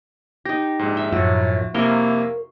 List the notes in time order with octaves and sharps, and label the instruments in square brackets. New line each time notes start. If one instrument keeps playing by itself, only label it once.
[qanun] D#4 G4 [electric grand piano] A#6
[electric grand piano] A#1 G#2
[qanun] E5
[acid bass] F#2 [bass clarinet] A2 [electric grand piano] F3 [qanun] F#4
[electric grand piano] F2 C3 E4 [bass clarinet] A#3 [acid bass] A#4 [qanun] C6 C#6